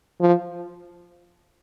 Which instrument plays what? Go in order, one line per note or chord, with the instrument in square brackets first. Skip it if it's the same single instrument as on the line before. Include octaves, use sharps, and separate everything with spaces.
[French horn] F3